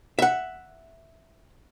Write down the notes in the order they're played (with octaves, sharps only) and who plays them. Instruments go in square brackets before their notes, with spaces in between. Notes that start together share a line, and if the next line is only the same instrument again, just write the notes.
[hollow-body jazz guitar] E5 F#5